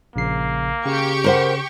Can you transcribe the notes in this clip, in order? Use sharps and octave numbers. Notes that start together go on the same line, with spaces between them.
A#1 C#3 A#3 C7
C#3 G4 C#6
A#4 C5 F#5